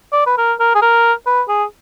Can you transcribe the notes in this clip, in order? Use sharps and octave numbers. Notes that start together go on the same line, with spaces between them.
D5
B4
A#4
A#4
G#4
A#4
B4
G#4